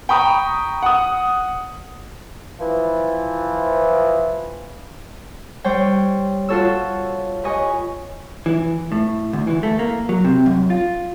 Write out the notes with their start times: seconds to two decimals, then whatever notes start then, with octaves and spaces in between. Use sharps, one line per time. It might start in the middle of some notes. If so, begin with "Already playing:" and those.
0.09 G5 A#5 B5 C#6 D#6
0.82 F#5 D#6
2.60 E3 F3
5.64 G3 G4 C5 C#5 G5
6.49 F4 F#4 A4 C#5 E6
7.43 G4 B4 C#5 D#5 G#5 C#6
8.46 E3
8.92 A2
9.33 D2
9.47 E3
9.63 A3
9.79 A#3
10.09 F#3
10.25 C3
10.46 F#2
10.70 F4